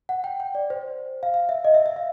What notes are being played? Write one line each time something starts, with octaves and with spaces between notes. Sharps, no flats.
F#5
G5
G5
D5
C5
F5
F5
E5
D#5
E5
E5
F5